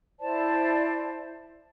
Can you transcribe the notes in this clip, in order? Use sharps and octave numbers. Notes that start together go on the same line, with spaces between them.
E4 C5 D5 A5